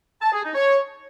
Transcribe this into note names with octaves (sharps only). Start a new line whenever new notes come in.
A5
G#4
D#4
C#5